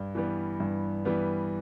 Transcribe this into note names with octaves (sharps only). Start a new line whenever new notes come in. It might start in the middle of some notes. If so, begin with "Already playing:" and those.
Already playing: G2
E3 G3 B3
G2
E3 G3 B3